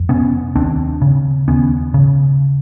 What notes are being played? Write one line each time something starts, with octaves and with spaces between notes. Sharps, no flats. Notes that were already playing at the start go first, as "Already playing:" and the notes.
Already playing: F2
C3 B3 C#4
D#2 C4 D4
C#3
D#2 B3 C#4
C#3